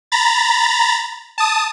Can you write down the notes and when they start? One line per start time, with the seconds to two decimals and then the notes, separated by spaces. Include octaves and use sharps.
0.12 A#5 B5 A6
1.38 A5 D#6